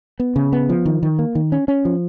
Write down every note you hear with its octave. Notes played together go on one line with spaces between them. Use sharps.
B3
C#3
B3
F3
D#3
D#3
A#3
D#3
C#4
C#4
F3